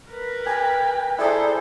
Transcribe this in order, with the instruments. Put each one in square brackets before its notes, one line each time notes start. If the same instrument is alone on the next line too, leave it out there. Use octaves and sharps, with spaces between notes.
[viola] A#4 B4
[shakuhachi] G5 [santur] G#5
[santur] E4 G#4 A#5 [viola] A4 C5 [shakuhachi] D5